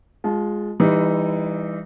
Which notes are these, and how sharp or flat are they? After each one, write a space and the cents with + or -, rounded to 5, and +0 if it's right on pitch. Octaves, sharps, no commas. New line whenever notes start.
G#3 +0 F4 +20 A5 -35
E3 +5 G3 +35 D#4 +0